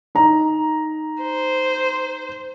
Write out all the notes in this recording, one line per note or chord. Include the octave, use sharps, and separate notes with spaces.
D#4 A#5
C5